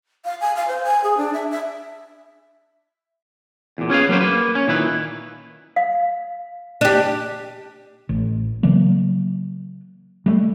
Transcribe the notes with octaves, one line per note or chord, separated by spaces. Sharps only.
F5
G#5
F5
C5
G#5
G#4
D4
E5
E5
E2 A#2
C#4 G#4 B4 F5
F#3 A#3 C#4 B4 C5
A#3 B4
C#4
A#2 D#3 E4 B4
F5
D4 G4
A1
C#3 E3 F#3 A#3
G3 A3